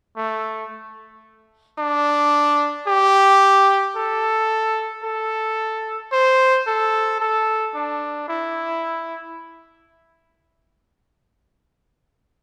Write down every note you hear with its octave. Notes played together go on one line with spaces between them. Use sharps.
A3
D4
G4
A4
A4
C5
A4
A4
D4
E4